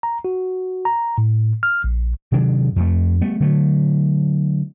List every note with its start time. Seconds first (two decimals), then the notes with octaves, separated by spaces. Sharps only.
0.03 A#5
0.25 F#4
0.85 A#5
1.18 A2
1.63 F6
1.84 A#1
2.32 C3 D#3 F#3 D4
2.76 F2 A3
3.22 G3 A3 B3
3.40 D3 F#3 A3